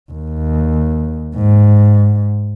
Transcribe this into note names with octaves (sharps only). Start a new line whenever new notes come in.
D#2
G#2